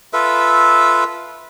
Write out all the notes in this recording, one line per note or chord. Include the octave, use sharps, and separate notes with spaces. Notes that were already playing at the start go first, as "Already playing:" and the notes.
F4 A4 B4 E5